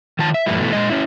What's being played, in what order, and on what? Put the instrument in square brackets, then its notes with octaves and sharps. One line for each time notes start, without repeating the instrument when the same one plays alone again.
[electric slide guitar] D#3 F3 A5
E5
F#2 A2 E3 G3 A3 E4
B2 E3 A3
A#2 G#3 D#5
C#4 E4